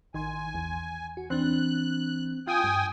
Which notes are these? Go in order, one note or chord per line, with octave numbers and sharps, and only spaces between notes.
A1 D#3 G#5 C6
E2
F#4
E3 C4 D4 F#6
F4 G5 G#5 D#6
G2